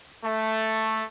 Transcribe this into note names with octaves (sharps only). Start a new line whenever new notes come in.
A3